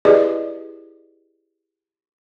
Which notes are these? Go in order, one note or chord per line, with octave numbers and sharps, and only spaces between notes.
E4 G4 G#4 B4 D5 D#5